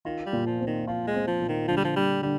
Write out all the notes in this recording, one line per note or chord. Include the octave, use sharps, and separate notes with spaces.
D#3 F4
G3
A#2
F3
C4
D#3
F3 F4
G#3
C4
F3
A#2
D#3
D3 F3
G3
F3
D3 G3
D3 G3